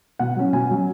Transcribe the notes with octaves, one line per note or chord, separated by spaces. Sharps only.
B2 F#5
F#3 C#4
B2 G#5
F#3 C#4